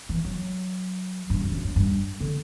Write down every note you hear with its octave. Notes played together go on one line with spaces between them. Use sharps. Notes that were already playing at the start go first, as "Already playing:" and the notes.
E3
F#3
G2
F#2
F#2
G2
G2
D3